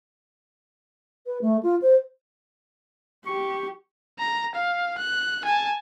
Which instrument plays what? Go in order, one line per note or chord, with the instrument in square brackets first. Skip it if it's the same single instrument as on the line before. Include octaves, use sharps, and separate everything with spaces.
[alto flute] B4
A3
F4
C5
[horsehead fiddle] G4 [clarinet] C#6
[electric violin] A#5
F5
F#6
G#5 A5